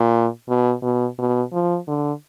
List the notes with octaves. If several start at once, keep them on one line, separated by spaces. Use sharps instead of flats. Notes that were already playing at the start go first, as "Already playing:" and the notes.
Already playing: A#2
B2
B2
B2
F3
D3